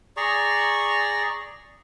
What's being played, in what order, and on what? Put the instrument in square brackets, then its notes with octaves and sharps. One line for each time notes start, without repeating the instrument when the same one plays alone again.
[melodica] G#4 D5 A#5 C#6